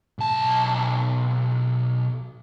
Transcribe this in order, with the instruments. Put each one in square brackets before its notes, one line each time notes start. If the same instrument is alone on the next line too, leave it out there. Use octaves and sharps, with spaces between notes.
[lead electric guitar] B1 A5